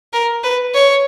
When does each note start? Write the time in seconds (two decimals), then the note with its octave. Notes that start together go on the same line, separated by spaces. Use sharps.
0.13 A#4
0.44 B4
0.74 C#5